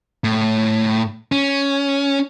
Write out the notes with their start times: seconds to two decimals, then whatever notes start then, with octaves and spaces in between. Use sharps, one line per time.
0.24 A2
1.32 C#4